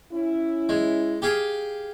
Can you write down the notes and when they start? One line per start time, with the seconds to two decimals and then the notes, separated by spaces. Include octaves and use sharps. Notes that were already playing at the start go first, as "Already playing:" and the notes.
0.12 C#4 E4
0.69 G#3
1.22 G4 G#4 F5